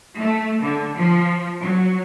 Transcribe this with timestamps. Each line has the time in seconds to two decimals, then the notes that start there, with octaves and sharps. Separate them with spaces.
0.20 A3
0.63 D3
0.97 F3
1.61 F#3